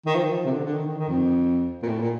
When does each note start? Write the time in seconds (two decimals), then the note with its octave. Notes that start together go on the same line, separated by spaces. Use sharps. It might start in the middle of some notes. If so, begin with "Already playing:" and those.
0.06 D#3
0.15 F3
0.23 D#3
0.32 F3
0.45 C3
0.52 D3
0.63 D3
0.74 D#3
0.86 D#3
0.97 D#3
1.08 F2
1.82 A#2
1.88 A2
1.99 A#2